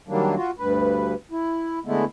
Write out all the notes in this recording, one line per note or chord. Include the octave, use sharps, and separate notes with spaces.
D#3 F#3 G3 A#3 D4
F4 F#4
D2 G2 B4
E4
D3 G#3 A3 B3 E4